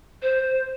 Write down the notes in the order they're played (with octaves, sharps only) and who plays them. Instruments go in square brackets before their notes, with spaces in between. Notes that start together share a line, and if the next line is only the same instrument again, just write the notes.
[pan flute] C5